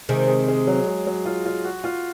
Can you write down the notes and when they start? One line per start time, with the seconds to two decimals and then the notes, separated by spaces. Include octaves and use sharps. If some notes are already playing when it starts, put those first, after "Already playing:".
0.09 C3 D#3 G#3
0.28 G#3
0.48 G#3
0.67 F#3
0.87 G#3
1.06 F#3
1.26 F4
1.46 F4
1.65 F#4
1.84 F4